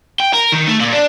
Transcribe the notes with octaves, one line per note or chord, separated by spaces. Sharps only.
G5
A#4
D#3
A3
A#2
D4